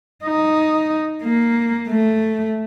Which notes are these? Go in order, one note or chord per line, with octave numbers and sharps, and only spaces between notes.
D#4
A#3
A3